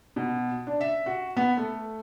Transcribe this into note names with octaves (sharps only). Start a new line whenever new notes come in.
B2
D4
E5
F#4
B3
A3